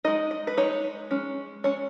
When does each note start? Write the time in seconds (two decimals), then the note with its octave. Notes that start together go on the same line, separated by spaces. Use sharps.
0.04 G#3 D#4 D#5
0.31 D#5
0.47 B4
0.57 G#3 D#4 C#5
1.11 G#3 C#4
1.64 G#3 C#4 C#5